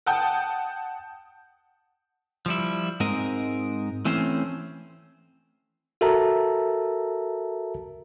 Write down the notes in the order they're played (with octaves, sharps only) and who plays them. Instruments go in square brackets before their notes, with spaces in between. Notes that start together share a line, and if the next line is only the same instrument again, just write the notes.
[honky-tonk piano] F#5 G5 A5 D#6 G6
[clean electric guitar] F3 G3 E4
G#2 G#3 C4 A#4 D#5
E3 A3 C4 C#4 C5
[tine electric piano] F#4 A4 A#4 E5 A5 A#5